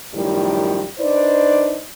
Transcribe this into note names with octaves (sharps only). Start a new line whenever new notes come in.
F#2 A2 D#3 F3 G3
D4 D#4 B4 C5 D5